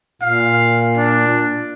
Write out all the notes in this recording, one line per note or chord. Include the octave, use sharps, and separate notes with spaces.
A#2 F5
D4